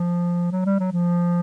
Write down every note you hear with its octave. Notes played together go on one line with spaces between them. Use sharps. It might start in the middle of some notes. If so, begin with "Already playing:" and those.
Already playing: F3
F#3
G3
F#3
F3